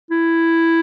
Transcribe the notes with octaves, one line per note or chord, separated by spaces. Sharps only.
E4